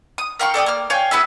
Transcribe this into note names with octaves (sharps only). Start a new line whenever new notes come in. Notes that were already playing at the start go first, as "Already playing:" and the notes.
D#6
A#4 F5 G5 C#6
A4 D5 G5 D#6
A#3 F6
C#5 F5 G5 G#5
B3 E4 G#4 E5